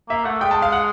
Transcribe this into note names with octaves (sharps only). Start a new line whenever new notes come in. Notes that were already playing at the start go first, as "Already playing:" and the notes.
A#3 E5
A3 F#5
G#3 G5
A5
F5
F#5